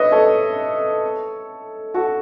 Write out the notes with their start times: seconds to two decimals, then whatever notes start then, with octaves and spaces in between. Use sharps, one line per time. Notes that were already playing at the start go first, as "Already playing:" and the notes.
Already playing: B4 C#5 D#5 E5
0.12 A4 C#5
1.94 F#4 A4